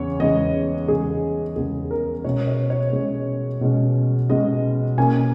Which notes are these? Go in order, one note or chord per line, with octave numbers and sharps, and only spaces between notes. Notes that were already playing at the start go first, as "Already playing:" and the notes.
Already playing: E2 C#3 C#5
E2 C#3 G#3 D#5
E2 C#3 G#3 G#4
E2 C#3 G#3 G#4
A#4
B2 G#3 C#4 C#5
C#5
C#5
B2 G#3 C#4
B2 G#3 C#4
B2 G#3 C#4 D#5
B2 A#3 C#4 G#5